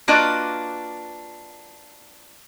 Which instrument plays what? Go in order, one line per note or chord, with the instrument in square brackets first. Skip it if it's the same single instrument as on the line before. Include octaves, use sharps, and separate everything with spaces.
[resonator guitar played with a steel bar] A#3 D4 F4 F#4 B4 D#5